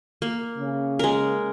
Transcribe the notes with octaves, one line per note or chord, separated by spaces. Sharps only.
A#3
C#3
G#3 A#4